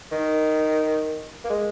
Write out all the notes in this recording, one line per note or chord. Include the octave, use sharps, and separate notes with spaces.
D#3
A#3
G#3